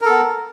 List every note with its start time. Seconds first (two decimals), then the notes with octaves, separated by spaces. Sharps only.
0.01 A#4
0.05 A4
0.09 B3